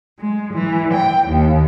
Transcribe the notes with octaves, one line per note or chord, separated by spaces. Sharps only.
G#3
E3
G5
D#2